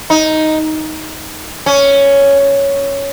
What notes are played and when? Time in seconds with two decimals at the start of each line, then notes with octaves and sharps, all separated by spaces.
0.10 D#4
1.66 C#4